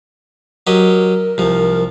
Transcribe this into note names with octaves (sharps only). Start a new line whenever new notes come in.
F#3 G4 A#4 D#5
C2 F3